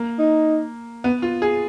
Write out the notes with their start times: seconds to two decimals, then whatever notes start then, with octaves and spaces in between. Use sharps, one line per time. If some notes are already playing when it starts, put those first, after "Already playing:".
Already playing: A#3
0.19 D#4
1.04 B3
1.22 F4
1.42 G#4